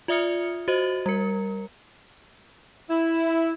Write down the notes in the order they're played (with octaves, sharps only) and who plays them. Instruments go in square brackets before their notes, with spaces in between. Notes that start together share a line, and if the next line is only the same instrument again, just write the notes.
[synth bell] F4 D5 E5 D#6 F6 C#7
F#4 C5 D#5
G3 A#4
[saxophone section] E4